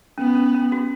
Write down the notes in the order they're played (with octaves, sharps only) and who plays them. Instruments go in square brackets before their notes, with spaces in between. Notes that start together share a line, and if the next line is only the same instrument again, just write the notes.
[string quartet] B3 [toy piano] C#4
[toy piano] C#4
C#4
F#4